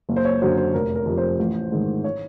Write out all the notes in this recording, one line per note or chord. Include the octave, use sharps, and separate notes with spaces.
F#1
C5
C#5
F#2 D3 F#3 C5
C5
F1 A#4
A#4
F2 C3
C5
A1
G#2 D#3
C#5